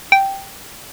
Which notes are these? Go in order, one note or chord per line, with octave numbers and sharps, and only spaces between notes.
G5